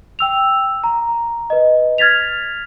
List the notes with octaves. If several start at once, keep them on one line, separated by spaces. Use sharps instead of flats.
G5 E6 F7
A#5
B4 D#5
F6 G#6 A6 B6 F7